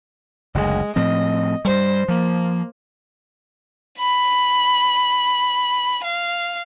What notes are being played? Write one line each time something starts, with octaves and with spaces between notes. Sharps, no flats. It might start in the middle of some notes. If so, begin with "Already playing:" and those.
F#1 D2 G#3
A2 F3 C4 D#5
G2 G3 C5
F3 A#3
B5
F5